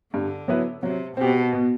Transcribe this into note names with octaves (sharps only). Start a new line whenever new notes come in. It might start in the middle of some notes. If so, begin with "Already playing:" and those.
G2 D3
F#3 B3 E4 B4
C3 F#3
B2 C4 G4
B2